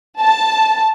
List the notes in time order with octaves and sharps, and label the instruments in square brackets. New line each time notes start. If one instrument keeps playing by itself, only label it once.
[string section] A5